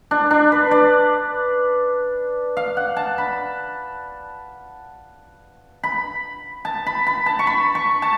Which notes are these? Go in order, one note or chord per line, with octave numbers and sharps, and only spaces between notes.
D4
D4
B4
D5
F5
F#5
A5
B5
B5
A5
B5
B5
A5
C#6
B5
C#6
A5